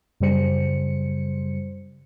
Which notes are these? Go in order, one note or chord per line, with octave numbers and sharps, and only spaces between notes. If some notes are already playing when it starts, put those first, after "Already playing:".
F#2 C#3 G3 C5 C#7